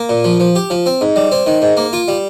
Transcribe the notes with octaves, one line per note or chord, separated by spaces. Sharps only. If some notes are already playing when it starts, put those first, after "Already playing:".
Already playing: A#3
A#2
F3
F3
G4
F3
C4
G#2
G3
C4
D#3
G#2
A#3
F4
G3